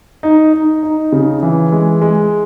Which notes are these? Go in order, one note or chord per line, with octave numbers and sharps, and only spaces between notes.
D#4
D#4
D#4
C#3
E3
G#3
G#3